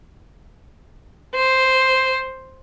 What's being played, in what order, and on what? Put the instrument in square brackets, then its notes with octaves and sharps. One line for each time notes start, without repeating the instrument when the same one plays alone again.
[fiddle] C5